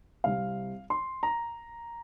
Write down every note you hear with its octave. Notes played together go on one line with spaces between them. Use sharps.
C2 C3 G3 C4 F5
C6
A#5